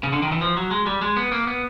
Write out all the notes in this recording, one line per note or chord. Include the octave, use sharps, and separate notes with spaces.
C#3
D3
D#3
E3
F3
F#3
G#3
G3
G#3
B3
A#3
B3